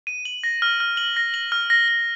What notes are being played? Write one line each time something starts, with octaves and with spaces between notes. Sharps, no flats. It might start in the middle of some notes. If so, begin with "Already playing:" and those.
D#7
F#7
A#6
F6
F6
F#7
A#6
F#7
F6
A#6
A#6